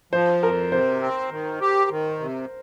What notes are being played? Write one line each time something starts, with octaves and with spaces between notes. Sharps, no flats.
F3 C5
F2 A#4
C3 C5
C4
D#3
G4
D#3
C3